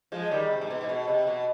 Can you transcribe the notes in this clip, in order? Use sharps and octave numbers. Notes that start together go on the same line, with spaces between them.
F3 G#3
D#3 G3
C3
G#2
B2
G#2
B2
C3
B2